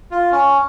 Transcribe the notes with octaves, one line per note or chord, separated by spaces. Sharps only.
F4
C#4